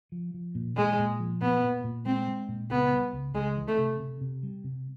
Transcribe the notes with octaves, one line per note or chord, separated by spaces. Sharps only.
F3
F3
A#2
A#2 G#3
A#2
F3
A#2 B3
A#2
A#2
G#3 C4
G#3
A#2
C#2 B3
G3
C#2
C#2 G#3
E3
A3
C3
C3
C3
G3
C3